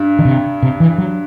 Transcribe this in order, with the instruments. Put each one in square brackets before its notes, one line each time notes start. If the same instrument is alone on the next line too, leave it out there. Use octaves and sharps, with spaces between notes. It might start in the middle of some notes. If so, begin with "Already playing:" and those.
Already playing: [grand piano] G2
[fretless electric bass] D#3
C3
C3
E3
F#3